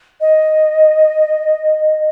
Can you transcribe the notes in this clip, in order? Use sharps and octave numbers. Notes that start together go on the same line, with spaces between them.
D#5